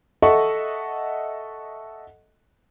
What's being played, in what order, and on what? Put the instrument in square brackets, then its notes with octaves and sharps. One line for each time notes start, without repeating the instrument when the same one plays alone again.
[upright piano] A4 D#5 E5 F#5 C#6